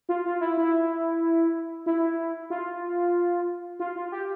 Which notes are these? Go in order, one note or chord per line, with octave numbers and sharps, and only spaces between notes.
F4
F4
E4
E4
E4
F4
F4
F4
G4